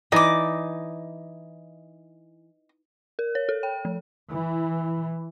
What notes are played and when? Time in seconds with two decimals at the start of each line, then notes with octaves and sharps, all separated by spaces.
0.12 E3 D#4 D5 D#5 D6
3.19 A#4
3.35 C#5
3.49 A4
3.63 G5
3.85 F3
4.32 E3